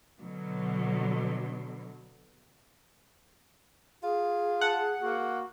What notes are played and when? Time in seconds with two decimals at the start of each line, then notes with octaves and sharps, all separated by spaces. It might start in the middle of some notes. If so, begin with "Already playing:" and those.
0.22 B2 D3 F#3
4.03 F4 G#4
4.61 F#5 A5
5.02 A#3 F#4